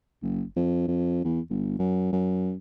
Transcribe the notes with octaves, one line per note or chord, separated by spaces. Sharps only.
F#1
F2
F2
E2
G1
F#2
F#2